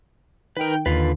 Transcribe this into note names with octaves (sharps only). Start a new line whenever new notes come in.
D#3 A#4 B4 G5
D#2 D3 F4 B4